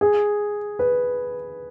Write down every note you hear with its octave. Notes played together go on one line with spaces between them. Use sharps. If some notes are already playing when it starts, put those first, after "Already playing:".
G#4
B4